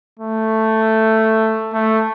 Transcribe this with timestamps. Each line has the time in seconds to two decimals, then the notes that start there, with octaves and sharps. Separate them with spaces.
0.19 A3
1.73 A3